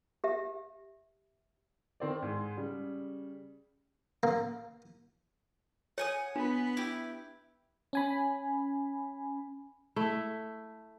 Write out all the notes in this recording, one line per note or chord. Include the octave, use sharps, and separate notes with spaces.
G4 E5
D#3 C4 D5
G#2 G#3
C#3 G3
A#3
C#5 F#5 G#5 D#6
B3 D4 B4
E4 G4
C#4 G#5 B5
A3 E4